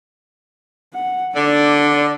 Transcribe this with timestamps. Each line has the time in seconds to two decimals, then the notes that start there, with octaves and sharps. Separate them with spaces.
0.94 F#5
1.35 D3 D4 D5